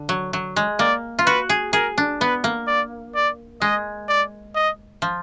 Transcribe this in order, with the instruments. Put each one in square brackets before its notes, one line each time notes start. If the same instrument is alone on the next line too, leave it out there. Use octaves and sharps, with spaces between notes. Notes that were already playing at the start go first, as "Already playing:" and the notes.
Already playing: [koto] D3
F#3
F#3
G#3
[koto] A#3 [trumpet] D5
[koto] F4
[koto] F#4 [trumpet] B4
[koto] G#4
[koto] G#4 [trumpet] A#4
[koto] D4
[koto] B3 [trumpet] B4
[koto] A#3
[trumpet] D5
D5
[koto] G#3 [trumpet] D#5
[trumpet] D5
D#5
[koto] F3